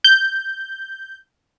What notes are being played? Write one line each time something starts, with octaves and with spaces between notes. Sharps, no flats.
G6